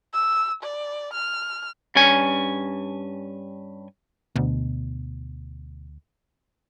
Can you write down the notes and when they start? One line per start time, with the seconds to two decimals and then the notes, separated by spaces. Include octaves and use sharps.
0.14 E6
0.63 D5
1.14 F6
1.95 G2 C#4 G#5
4.36 D2 B2